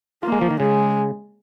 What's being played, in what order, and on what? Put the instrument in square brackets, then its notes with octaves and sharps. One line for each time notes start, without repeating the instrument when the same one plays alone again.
[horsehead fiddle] A#3 [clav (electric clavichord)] F4
[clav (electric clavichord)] G#3
F3
D#3
[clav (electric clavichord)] C#3 [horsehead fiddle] G#3